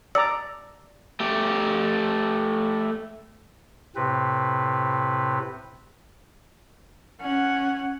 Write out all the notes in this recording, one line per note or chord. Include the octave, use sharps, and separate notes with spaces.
D5 A#5 E6
A3 G4
A2 C3 C4 B4
C#4 F#5